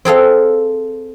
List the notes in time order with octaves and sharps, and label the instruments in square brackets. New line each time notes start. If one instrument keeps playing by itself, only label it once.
[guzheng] C4 G#4 A4 F5